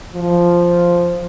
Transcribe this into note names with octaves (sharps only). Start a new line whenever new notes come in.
F3